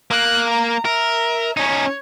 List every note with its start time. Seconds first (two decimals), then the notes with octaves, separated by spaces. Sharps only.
0.11 A#3 F#6
0.50 A#5
0.85 A#4 E5
1.57 C#4 D#4 C#5